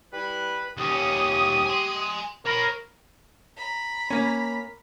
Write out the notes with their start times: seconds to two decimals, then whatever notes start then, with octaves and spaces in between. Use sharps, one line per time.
0.12 G3 E4 B4
0.77 D#2 C#4 G4 D#6
1.66 G#5 C6
2.46 A#4 C#5 B5
3.56 A#5 B5
4.10 A#3 C#4